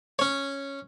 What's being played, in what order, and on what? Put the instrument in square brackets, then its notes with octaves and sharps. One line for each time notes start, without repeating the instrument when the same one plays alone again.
[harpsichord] C#4 C#5